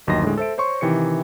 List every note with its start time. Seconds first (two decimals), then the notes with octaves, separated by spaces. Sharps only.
0.07 G1 D#2 F#3 D#5 C6 A#6
0.23 A2 D3 G#3
0.37 A4 C5 E5 D7
0.58 C5 C#5 C6 C#6
0.81 C3 D#3 E3 G4 C#7